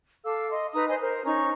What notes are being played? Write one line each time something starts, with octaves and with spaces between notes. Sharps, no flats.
A4 F5 D6 E6
D#5 C6
D#4 B4 A#5 D#6
C5 D#5 G#5
A#4 C5
C#4 D#4 A#5 C#6